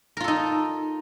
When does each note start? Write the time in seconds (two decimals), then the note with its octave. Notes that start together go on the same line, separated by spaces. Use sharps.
0.17 A#4
0.20 F4
0.24 A4
0.28 D#4